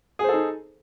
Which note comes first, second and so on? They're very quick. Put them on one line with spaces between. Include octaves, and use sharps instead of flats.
G#4 C5 A4 D#4